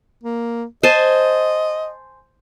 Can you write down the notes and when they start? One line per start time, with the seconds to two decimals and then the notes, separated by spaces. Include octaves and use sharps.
0.23 A#3
0.83 C5 D#5 G#5 A5